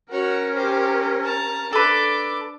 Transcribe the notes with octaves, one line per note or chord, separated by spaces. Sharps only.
C#4 F#4 A#4 C#5
G4 C5
A5 A#5
D4 A4 B4 D6